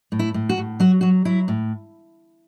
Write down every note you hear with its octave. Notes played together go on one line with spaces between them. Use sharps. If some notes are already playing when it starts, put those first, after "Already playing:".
A2
E4
A2
F#4
A2
F#3 F#4
F#3 F#4
F#3 E4
A2